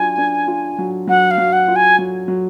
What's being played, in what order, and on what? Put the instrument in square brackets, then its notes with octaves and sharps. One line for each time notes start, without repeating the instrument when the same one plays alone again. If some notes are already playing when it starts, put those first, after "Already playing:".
Already playing: [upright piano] F#3 D4 F4 [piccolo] G#5
[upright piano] D4
F4
F#3
[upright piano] F#3 [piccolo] F#5
[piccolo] F5
[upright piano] F#3
[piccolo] F#5
[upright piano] F4
[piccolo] G#5
[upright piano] F#3
F#3